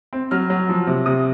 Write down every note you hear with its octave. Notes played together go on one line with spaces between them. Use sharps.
C4
F#3 F6
F#3
F3
C3
C3 D#6